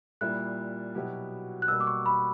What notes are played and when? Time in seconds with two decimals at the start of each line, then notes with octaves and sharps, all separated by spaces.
0.21 A#2 G3 A#3 E4 F#6
0.95 B2 F#3 B3 E4 G4
1.62 F#6
1.68 B2 E6
1.71 G3 A#3
1.80 D6
1.87 C#6
2.06 B5